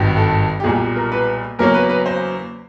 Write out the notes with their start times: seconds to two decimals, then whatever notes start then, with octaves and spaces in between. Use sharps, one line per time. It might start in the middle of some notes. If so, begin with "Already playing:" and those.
Already playing: G#1 G2 D#3
0.17 A4
0.60 G4
0.64 B1 A#2 G3 G#4
0.96 A#4
1.12 B4
1.59 E2 C#3 F#3 A#3 C#4 A#4
1.74 B4
1.89 B4
2.06 C5